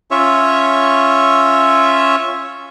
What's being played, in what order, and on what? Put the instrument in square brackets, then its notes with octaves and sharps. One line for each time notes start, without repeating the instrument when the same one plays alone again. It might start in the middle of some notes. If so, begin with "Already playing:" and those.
[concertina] C#4 F4 C#5 E5